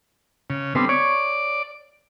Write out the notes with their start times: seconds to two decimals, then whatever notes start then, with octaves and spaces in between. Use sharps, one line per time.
0.50 C#3
0.75 D3 G3 B3 C4
0.89 C#5 D5